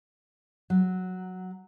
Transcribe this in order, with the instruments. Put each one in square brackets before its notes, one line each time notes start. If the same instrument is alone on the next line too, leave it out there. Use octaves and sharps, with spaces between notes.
[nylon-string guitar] F#3